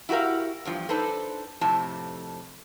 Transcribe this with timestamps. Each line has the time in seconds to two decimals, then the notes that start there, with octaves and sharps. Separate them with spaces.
0.09 E4 F#4 G4 A#4 F5
0.65 E2 G2 F3
0.89 D4 D#4 A4 B4 C5
1.61 F2 A2 C3 A5